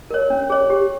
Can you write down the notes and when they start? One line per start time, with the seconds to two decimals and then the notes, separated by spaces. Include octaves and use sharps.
0.11 A#4 C#5
0.30 C#4
0.50 G#4 C#5
0.70 G4